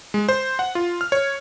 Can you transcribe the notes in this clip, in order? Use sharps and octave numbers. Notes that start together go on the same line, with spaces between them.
G#3
C5
F#5
F4
F6
C#5